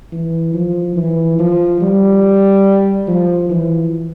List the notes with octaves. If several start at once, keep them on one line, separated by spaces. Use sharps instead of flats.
E3
F3
E3
F3
G3
F3
E3